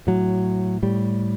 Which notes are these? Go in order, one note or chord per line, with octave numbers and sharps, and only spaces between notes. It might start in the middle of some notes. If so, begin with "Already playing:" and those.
A2 F#3
A2 G3